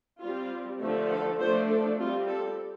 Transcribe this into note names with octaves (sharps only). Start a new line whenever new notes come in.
G3 C4 F4
D3 F3 A3
A4
F3 A3 D4 C5
A4
G3 C4 F4
A4